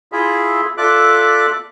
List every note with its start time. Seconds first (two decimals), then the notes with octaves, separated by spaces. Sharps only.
0.12 E4 F4 G#4 E5
0.78 F4 A4 D5 E5 D6 F#6